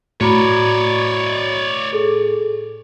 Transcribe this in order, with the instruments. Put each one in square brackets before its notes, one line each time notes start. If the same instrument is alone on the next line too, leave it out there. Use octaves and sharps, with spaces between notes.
[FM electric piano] A2 [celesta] F#4 A#5 B5 [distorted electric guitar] C#5 D5
[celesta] G#4 A4